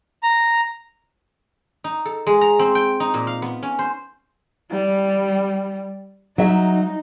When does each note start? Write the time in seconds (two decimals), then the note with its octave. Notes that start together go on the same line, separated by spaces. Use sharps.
0.23 A#5
1.84 D#4
2.05 A4
2.27 G#3
2.41 A#5
2.59 C4
2.75 G5
3.00 D#4
3.14 A#2
3.27 F5
3.42 B3
3.63 C#4
3.79 C5
4.72 G3
6.38 F#3 D#4 E5